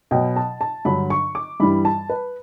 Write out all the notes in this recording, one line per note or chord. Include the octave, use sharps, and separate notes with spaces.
B2 F#3 G5
A5
A5
G2 D3 F#3 B5
C#6
D6
G2 E3 G3 B5
A5
B4